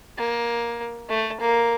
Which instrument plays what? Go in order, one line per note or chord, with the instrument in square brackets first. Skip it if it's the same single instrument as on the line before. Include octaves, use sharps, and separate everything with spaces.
[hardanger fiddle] A#3
A3
A#3